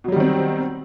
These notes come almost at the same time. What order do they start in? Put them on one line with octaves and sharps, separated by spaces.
B2 F#3 G3 D#3 C4